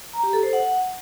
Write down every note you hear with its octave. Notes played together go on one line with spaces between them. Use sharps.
A#5
G4
A4
C5
F#5